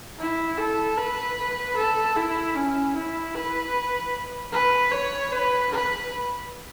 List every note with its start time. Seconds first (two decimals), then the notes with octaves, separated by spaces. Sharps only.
0.19 E4
0.58 A4
0.97 B4
1.77 A4
2.16 E4
2.55 C#4
2.95 E4
3.34 B4
4.53 B4
4.92 C#5
5.32 B4
5.71 B4